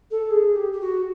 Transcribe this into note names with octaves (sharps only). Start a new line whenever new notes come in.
A4
G#4
G4
G4
F#4